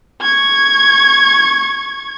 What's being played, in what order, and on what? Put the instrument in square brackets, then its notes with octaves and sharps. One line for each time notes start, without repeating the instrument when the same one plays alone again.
[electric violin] C#6 G#6